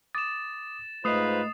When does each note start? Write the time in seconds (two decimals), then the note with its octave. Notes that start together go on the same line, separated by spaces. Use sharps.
0.15 D6 D#6 A6 E7
1.05 G#2 A3 F4 B4 C5 D#5 D#6 C7